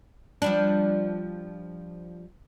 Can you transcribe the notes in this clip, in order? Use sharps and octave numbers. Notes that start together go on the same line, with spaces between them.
F3 G3 D4